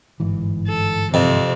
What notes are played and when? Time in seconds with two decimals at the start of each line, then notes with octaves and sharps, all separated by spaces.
0.20 G1 G#2 E3
0.68 A4
1.14 F2 C3